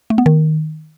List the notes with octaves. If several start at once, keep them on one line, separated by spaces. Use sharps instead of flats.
A3
B3
D#3